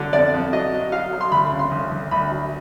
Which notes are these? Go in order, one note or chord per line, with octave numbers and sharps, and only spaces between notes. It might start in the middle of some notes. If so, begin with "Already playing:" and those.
Already playing: D3 F#3
F2 D5
F2
F#3 D#5
F#3
F#3 F5
F#3
C6
D2 B5
C#3
C6
D2
D2
D2 B5
F#3